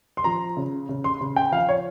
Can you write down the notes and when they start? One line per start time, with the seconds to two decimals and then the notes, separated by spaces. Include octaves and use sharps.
0.17 C6
0.24 F3 A#5
0.57 C#3
0.89 C#3
1.04 C6
1.21 C#3
1.36 G5
1.52 F3 F5
1.69 C#5